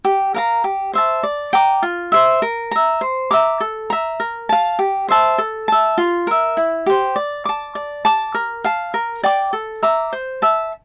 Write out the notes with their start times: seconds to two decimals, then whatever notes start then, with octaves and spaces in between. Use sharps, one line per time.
0.05 G4
0.34 A#4 F5 A#5
0.64 G4
0.93 C5 E5 A5
1.23 D5
1.53 G5 A#5 D6
1.83 F4
2.12 C5 E5
2.42 A#4
2.71 E5 A#5
3.01 C5
3.31 E5 A#5 D6
3.61 A4
3.90 E5 A#5
4.20 A#4
4.49 F5 A5
4.79 G4
5.09 C5 E5 A5
5.38 A4
5.68 E5 A5
5.98 F4
6.27 A#4 E5
6.57 E4
6.86 G4 C5
7.16 D5
7.45 A5 D6
7.75 D5
8.05 A5 D6
8.34 A#4
8.64 F5 A5
8.94 A#4
9.23 D5 G5 D6
9.53 A4
9.82 E5 A#5 D6
10.13 C5
10.42 E5 A5